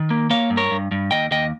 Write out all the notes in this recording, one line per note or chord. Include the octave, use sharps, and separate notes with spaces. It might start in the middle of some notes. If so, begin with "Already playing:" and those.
Already playing: D#3
A#3
A#3 C#5 F5
G2
A#4 C#5
G2
G2
D#2 D#5 G5
D#2 D#5 G5